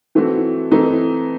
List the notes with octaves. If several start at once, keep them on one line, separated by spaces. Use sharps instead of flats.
E3 A3 C4 F#4
E3 A3 C4 D#4